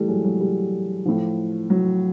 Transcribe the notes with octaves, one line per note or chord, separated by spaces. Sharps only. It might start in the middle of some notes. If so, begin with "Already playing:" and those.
Already playing: A2 E3 G3 A3
F#3 G#3
F#3
G3
A2 F3
F#3